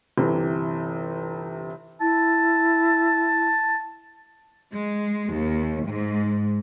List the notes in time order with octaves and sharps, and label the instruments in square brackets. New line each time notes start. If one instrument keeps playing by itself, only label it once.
[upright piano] G1 C3 E3
[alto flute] E4 [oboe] A5
[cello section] G#3
D#2
G#2